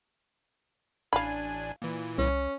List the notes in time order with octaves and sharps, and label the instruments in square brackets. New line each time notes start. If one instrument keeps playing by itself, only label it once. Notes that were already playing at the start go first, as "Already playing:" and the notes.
[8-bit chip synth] A1 D4 G#5 [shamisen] F5 B5
[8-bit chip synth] A#2 E3
[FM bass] C2 [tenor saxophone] C#4